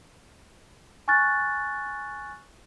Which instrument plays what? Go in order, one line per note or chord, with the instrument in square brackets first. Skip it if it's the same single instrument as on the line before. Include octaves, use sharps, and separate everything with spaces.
[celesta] G#5 C#6 F6 F#6 A6